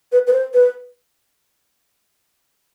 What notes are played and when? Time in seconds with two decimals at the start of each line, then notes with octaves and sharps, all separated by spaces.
0.12 B4
0.27 B4
0.33 C5
0.54 B4